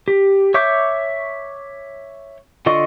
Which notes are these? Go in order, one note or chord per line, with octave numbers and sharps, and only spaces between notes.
G4
C#5 E5 C#6 D6 G6
D3 F4 D#5 C#6